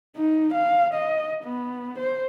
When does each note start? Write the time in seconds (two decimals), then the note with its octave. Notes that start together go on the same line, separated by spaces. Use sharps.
0.17 D#4
0.54 F5
0.94 D#5
1.44 B3
1.98 C5